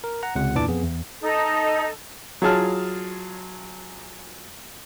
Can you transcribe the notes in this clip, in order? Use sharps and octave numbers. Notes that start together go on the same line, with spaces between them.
A#4
F#5 A#5
C#2 C3 F#5
E2 A#2 E3 D4 A5 D6
F2 B3 G#4
E2
D#4 A4
F#3 F4 G#4 A5 F6